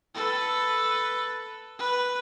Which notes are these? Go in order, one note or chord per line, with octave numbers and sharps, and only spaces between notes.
A4 B4
B4